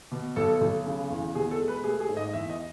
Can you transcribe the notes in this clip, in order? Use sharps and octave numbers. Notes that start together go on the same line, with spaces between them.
B2
B1 A4
B1
C#3
E2
B2 G#4
A4
G#3
B4
A3 G#4
G#4
G#2
D#5
E2 E5
D#5